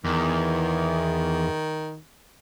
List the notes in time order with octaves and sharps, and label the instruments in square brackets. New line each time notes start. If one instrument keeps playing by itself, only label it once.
[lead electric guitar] E2 [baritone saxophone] D#3